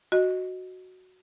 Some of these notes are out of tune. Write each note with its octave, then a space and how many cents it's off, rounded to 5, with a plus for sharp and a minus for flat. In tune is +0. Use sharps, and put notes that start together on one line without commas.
F#4 +0 D#5 +0